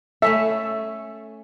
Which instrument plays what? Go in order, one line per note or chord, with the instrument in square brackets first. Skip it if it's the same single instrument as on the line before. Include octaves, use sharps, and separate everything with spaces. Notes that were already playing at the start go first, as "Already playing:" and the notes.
[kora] A3 C#4 A4 [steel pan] E5